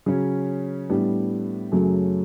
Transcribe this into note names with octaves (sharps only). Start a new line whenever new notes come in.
C#3 F#3 C#4
A2 G3 B3 D4
F#2 C#3 F#3 A3